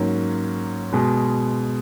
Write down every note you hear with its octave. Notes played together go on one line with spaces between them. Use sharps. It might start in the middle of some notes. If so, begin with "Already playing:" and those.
Already playing: G#2 F#3 A#3 C#4
B2 G#3